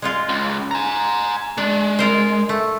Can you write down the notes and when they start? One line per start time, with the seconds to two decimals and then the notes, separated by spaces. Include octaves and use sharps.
0.02 G#3 D#4 F4
0.29 C#2
0.71 G#5 A#5
1.58 G#3 D4
1.99 F4 A#4 C5
2.49 A3